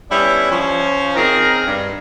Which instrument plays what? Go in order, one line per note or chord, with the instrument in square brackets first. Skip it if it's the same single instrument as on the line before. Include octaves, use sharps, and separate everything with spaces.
[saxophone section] G3 B3 C#4 D4 E4
F3 C#4
C4 D#4 G#4 A#4
G2